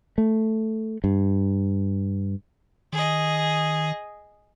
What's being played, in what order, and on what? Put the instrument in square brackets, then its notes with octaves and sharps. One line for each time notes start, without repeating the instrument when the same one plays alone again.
[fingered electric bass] A3
G2
[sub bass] D#3 [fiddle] G#4 D#5